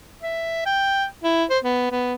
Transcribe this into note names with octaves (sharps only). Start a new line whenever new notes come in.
E5
G5
E4
C5
B3
B3